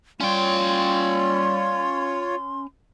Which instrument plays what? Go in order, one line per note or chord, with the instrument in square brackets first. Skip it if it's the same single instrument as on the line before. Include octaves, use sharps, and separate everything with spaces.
[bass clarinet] G3 [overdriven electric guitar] C#4 G5 [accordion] F4 C#5 [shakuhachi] C6